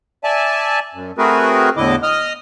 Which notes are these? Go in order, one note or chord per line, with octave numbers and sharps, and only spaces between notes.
D5 E5 G#5 A5
F#2
A3 C4 F#4 G#4 A#4 B4
E2 A2 D3 E4 D#5 D6
D#5 D#6 F6